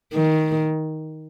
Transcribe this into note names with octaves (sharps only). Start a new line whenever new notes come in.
D#3